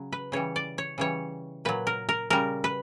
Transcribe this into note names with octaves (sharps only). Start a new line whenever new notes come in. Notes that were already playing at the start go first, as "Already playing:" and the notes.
Already playing: C#3 F#3
B4
C#3 E3 G3 C#5
D5
C#5
C#3 E3 G3 C#5
A#2 F#3 B4
A#4
A#4
C#3 G3 A#4
B4